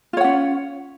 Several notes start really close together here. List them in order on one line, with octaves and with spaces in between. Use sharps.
F4 C#5 F#5 C#4